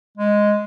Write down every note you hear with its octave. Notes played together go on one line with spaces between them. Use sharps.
G#3